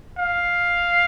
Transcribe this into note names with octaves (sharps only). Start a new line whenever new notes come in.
F5